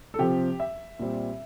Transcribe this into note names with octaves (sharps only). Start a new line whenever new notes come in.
A4
C3 F3 C4 G4
E5
A#2 G3 C4